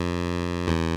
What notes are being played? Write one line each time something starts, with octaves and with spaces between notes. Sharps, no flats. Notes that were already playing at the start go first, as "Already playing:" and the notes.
Already playing: F2
E2